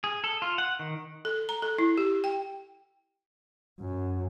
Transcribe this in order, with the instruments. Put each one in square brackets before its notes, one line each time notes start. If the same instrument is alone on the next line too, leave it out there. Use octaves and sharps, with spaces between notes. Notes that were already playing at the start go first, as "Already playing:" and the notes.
[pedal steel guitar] G#4
A4
F4
F#5
D#3
[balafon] A4
A#5
A4
E4
G4
G5
[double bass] F#2